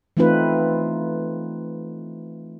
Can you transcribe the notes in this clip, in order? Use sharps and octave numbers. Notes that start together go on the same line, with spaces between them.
E3 A3 C4 D#4 F4 B4